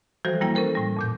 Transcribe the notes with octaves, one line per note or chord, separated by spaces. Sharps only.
E3 F3 G3 F#4 A4 C5
E2 G3 A#3 E4 G5
C#4 A4 A#4 C5
A2 G3
F2 A#2 G6